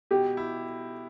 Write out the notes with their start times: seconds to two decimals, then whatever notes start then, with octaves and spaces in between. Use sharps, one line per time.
0.11 B2 G4
0.37 E4